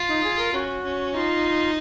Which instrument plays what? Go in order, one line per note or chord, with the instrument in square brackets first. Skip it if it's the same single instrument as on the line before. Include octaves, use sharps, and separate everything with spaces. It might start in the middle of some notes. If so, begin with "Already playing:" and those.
Already playing: [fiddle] F4
[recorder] D#4
G#4
A#4
[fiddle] C#4 [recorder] F#4
[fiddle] C#4
[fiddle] D#4 [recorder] F4